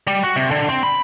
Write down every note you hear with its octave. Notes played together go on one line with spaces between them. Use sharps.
G3
F#4
C3
D3
C4
B5